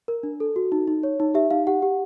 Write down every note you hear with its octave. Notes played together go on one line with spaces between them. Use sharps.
A#4
D4
A4
F#4
D#4
D#4
C#5
D#4
G4 E5
D#4 F5
G4 F#5
G4